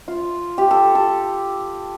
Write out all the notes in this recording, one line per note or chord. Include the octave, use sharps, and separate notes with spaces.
F4
G4
A4
A4